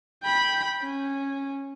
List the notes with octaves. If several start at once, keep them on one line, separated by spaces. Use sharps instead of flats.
G5 B5
C#4